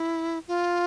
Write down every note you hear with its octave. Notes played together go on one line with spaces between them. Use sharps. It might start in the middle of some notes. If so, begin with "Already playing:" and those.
Already playing: E4
F4